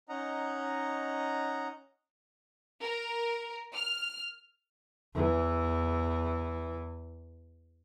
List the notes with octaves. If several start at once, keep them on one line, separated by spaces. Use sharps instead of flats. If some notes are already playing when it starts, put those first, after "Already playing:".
C#4 D#4 D#5 F#5 A#5
A#4
F6
E2 E3